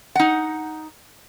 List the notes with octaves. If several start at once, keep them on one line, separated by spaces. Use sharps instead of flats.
D#4 F#5